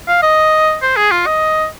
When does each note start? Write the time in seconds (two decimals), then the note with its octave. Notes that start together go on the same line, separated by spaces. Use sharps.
0.08 F5
0.22 D#5
0.82 C5
0.97 G#4
1.11 F4
1.26 D#5